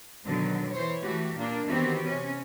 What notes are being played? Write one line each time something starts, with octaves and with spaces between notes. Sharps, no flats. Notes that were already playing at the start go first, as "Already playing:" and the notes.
B2 D3 D#3 F#3
E3 C5 C#5
E3 A3 F#4 G4
A#2 A#3 D4
D#3 E3 B3 C4 F#4 G4
C3 C#4